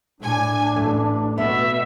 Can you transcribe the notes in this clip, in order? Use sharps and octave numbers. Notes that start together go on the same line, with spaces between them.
A2 D4 G#5
A1 A3
B2 B3 E5